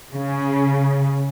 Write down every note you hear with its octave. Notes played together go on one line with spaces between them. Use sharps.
C#3